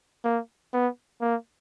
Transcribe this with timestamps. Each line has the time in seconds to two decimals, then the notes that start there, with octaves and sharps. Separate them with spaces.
0.24 A#3
0.73 B3
1.21 A#3